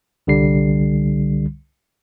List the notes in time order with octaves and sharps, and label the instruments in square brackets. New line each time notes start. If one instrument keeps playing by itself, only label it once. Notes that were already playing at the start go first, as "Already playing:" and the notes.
[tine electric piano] C2 D3 G3 C7